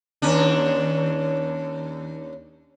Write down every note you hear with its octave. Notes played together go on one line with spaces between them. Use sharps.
D#2 C#4 D4